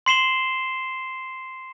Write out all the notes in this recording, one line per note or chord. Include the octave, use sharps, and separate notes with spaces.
C6 C7 E7 G7